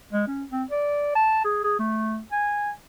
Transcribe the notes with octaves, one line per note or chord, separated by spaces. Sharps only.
G#3
C#4
C4
D5
A5
G#4
G#4
A3
G#5